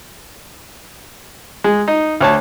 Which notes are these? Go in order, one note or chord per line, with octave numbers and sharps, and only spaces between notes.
G#3
D#4
D2 C#5 A5